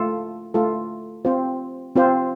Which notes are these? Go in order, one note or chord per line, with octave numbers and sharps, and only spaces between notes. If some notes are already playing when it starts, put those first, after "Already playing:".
Already playing: A3 F4 A4
A3 F4 A4
C4 F4 C5
C4 F4 C5